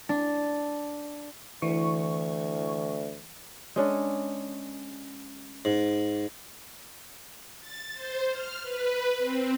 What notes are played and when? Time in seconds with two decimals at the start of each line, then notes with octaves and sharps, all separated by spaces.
0.09 D4
1.62 D2 E3 C#6
3.76 G#3 C#4 D4
5.65 G#2
7.60 A6
7.94 C5
8.30 F6
8.62 B4
9.18 C4